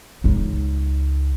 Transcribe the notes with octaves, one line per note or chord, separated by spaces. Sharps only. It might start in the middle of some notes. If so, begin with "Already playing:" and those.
C#2 D#4